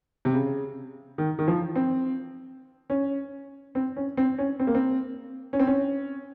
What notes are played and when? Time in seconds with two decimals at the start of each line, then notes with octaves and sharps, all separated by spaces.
0.25 C3
0.33 C#3
1.18 D#3
1.39 D#3
1.48 F3
1.76 C4
2.90 C#4
3.75 C4
3.96 C#4
4.17 C4
4.38 C#4
4.60 C4
4.67 A#3
4.75 C4
5.53 C#4
5.60 C4
5.67 C#4